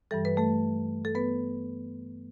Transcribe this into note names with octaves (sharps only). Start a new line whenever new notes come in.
G2 E3 G3 A4
B4
A3 A4
A4
B3 B4